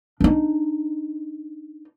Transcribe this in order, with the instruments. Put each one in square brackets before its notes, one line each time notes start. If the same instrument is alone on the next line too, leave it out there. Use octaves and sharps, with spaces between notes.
[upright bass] D4 D#4